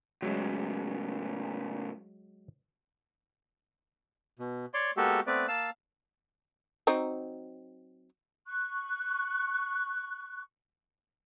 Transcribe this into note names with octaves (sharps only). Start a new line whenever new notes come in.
A2 C#3 F#3 G#3
B2
C#5 D5 C6
G#3 A#3 B3 F#4 G4 A4
A3 B3 C4 B4 D5
A#3 F5 A5 E6
F#3 C4 D#4
C#6 F#6